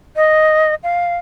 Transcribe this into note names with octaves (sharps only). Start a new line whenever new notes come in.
D#5
F5